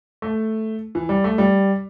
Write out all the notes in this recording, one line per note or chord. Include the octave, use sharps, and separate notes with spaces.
A3
E3
G3
A3
G3